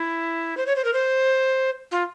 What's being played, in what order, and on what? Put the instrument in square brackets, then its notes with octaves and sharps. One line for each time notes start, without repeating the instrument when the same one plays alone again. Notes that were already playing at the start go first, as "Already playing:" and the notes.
Already playing: [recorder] E4
C5
C#5
C5
A#4
C5
F4